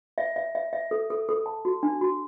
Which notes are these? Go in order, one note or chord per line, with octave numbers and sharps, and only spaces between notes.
E5
E5
E5
E5
A4
A4
A4
A5
F#4
D4
F#4